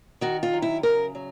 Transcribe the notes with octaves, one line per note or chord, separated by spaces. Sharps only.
D#3 F#4
F4
F#3
E4
C#3 A#4
F#3